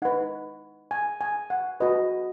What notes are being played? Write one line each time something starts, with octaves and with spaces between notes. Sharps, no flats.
D#4 B4 F#5
G#5
G#5
F#5
F#4 B4 D#5